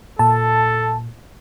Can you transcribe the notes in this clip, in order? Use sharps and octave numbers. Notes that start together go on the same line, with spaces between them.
A#2 A4 A5